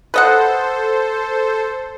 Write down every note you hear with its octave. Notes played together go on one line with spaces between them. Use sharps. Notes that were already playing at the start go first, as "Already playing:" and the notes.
A4 B4 C5 D#5 F#5